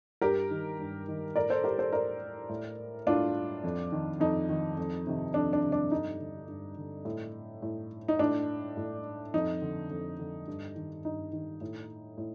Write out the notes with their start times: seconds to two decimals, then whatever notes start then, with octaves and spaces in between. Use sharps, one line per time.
0.21 G2 G4 A#4
0.51 D#3
0.79 G2
1.08 D#3
1.36 A2 A#4 D5
1.50 A4 C5
1.64 G4 A#4
1.79 A4 C5
1.93 A2 A#4 D5
2.49 A2
3.07 A2 D4 F4
3.64 F2
3.92 D#3
4.20 F2 D#4
4.49 D#3
4.77 F2
5.07 C3 D#3
5.34 F2 D4
5.53 D4
5.63 C3 D#3
5.72 D4
5.91 G2 D#4
6.20 D3
6.48 G2
6.78 D3
7.05 A2
7.62 A2
8.08 D#4
8.19 A2 D4
8.77 A2
9.34 F2 D#4
9.62 D3
9.90 F2
10.19 D3
10.47 G2
10.76 D#3
11.05 G2 D#4
11.33 D#3
11.61 A2
12.18 A2